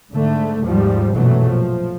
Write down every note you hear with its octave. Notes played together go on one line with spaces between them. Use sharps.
G#2 D3 A3
D#2 G#2 F3 G3
A#1 F#2 B2 E3 F#3 A3
F3